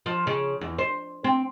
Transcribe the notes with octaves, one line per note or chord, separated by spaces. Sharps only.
F3
C#3
E2
C5
C4